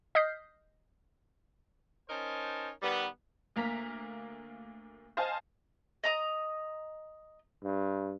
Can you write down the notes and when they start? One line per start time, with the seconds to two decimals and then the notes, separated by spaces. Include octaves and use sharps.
0.15 D#5 D#6 F6 G6 B6 C7
2.09 C#4 D#4 A#4 C5 A5
2.83 D#3 G3 B3
3.56 D2 A#3 A#5 B6
5.17 C5 D#5 F5 G#5 A5
6.04 D#5 A#5 D#6
7.64 G2